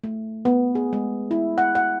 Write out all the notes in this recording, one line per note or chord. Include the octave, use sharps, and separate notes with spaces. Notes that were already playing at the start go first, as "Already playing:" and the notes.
A3
B3
G#4
G#3
E4
F#5
F#5